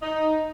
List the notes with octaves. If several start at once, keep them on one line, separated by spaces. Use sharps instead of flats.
D#4